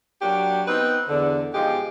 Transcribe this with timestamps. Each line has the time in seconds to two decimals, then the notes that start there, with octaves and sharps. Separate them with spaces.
0.22 F#3 A#3 D4 F#4 G4
0.66 B3 C4 D#4 B4
1.09 E2 D3
1.54 B2 F3 G#3 D#4 G4